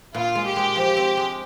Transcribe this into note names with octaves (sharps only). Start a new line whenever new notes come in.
A#2 F4
G#3
G4
G#3
F3
C4
G#3